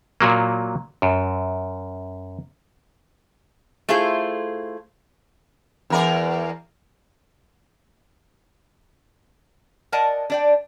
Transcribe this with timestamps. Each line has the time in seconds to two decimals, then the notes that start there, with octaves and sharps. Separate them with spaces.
0.21 A#2 F#3 A#3
1.02 F#2
3.89 A3 E4 F4 G#4 C5
5.90 E2 A#4 D5
9.92 A#4 D5 D#5 F#5 G#5 A5
10.30 D4 D5 G5